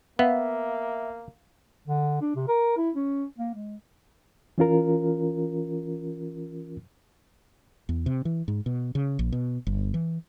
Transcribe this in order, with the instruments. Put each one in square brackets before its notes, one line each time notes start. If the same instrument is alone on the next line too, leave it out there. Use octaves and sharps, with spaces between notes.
[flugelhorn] A#3 [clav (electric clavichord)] B3 [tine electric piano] E5 [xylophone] F5
[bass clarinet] D3
D4
C3
A#4
E4
C#4
A#3
G#3
[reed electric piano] E3 C#4 F4 A#4
[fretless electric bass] E2
C3
E3
G#2
B2
C#3
A#1
B2
G1
E3